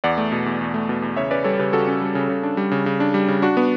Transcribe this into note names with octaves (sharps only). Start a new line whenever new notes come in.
E2 D5 F#5
A3
B2
E2
E2
A3
B2
E2
C#3 C#5 E5
C#4 B4 D5
G3 A4 C#5
C#3 G4 B4
C#3 F#4 A4
C#4
G3
C#3
C#3
D4
G3
C#3
C#3
D4
G3
C#3
D4 F#4
B3